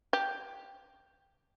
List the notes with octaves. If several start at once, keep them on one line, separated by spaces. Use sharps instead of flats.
G4